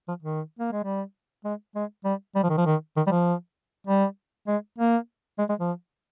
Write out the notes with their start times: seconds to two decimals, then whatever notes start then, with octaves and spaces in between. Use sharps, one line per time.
0.08 F3
0.23 D#3
0.59 A#3
0.72 G#3
0.84 G3
1.45 G#3
1.75 G#3
2.05 G3
2.35 G3
2.43 F3
2.50 D#3
2.58 F3
2.66 D#3
2.97 D#3
3.07 G3
3.11 F3
3.87 G3
4.48 G#3
4.79 A#3
5.39 G#3
5.49 G#3
5.60 F3